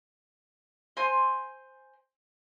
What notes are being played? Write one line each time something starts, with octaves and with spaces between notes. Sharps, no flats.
C5 G#5 C6